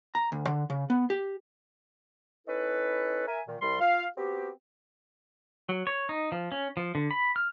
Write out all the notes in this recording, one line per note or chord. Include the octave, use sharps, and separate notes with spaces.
A#5
D2
D3
C#3
B3
G4
C#4 D#4 E4 A4 B4
A#4 E5 G#5
A#2 D#3
C2 G3 C6
F4 F5
B3 C4 F#4 G4
F#3
C#5
D#4
F3
C#4
F3
D3
B5
F6